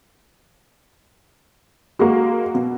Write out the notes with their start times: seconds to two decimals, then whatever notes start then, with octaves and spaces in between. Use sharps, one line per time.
1.99 G#3 A#3 F#4
2.55 B2